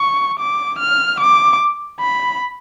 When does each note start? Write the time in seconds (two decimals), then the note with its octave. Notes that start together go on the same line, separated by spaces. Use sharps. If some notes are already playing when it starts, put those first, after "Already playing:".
Already playing: C#6
0.39 D6
0.79 F6
1.21 D6
2.00 B5